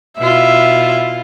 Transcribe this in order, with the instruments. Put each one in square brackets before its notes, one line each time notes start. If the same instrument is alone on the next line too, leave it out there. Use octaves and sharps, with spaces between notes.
[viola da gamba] B2 E4 F4 [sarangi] E5